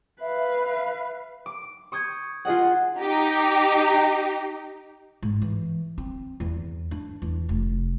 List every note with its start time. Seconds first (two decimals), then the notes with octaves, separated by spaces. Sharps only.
0.22 B4 E5 F5
1.46 D6
1.92 C#6 D#6 G6 G#6
2.45 F4 G#4 D#5 F#5
2.98 D#4 G4
5.22 G#2
5.42 E3
5.98 C4
6.40 E2
6.91 D4
7.22 E2
7.49 F1